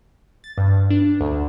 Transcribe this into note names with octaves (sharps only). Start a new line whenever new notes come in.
A6
G2
D4
D2